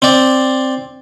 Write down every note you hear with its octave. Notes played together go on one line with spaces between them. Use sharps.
C4 D5